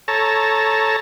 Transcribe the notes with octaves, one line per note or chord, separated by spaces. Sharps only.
A4 C#5 A5 A#5